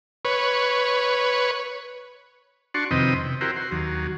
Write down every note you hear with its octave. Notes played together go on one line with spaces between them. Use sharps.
B4 C#5
D4 F#4 A5 C6 C#6
F2 C3 D#3 C4 B4 D#5
C3
E4 F#4 G4 A#4 C5
F#4 C6
D#2 F#3